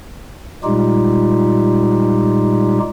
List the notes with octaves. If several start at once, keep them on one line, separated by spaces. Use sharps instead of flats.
A#2 G3 G#3 D#4 F4 G4